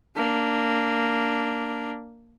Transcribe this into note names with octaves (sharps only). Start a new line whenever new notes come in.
A#3 D4